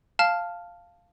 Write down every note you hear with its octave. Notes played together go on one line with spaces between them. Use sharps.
F5 A5 F6